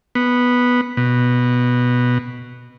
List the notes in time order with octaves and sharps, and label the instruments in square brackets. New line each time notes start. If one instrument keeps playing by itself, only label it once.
[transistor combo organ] B3
B2